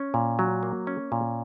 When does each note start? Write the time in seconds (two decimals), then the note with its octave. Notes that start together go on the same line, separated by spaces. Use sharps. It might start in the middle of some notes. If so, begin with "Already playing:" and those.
Already playing: C#4
0.14 A#2
0.39 F#3
0.63 A#3
0.87 C#4
1.12 A#2